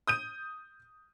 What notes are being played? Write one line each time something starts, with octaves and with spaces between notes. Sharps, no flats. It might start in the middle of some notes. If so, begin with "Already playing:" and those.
D#6 G6 D#7